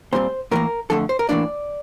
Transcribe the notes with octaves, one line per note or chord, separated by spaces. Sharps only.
A#2 G3 C4 C5
A2 E3 A#3 A#4
F2 D3 A3 A4
C5
A#4
A2 E3 A#3 D4 D5